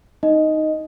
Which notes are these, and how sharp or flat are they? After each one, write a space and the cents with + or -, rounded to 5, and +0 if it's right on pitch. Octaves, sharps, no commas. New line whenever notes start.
D#4 +0 D#5 +0